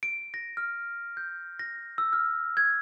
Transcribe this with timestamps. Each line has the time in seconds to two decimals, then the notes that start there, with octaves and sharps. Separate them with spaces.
0.03 D7
0.34 A#6
0.57 F6
1.17 G6
1.59 A#6
1.98 E6
2.13 F6
2.57 G#6